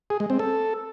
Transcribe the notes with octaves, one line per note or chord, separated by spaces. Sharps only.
G#4
G#3
C4
A4